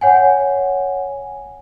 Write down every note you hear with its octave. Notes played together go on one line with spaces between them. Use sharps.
C#5 F#5 G#5